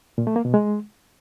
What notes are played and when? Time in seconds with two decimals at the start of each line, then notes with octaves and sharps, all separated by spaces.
0.18 A#2
0.27 A3
0.36 A#3
0.45 B2
0.54 G#3